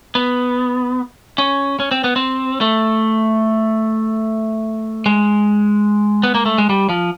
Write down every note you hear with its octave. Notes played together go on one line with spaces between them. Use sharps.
B3
C#4
C#4
C4
B3
C4
A3
G#3
B3
A#3
A3
G#3
G3
F3